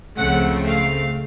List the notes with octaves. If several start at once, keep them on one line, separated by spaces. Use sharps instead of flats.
C#2 C#3 F3 A3 C4 F#5
F5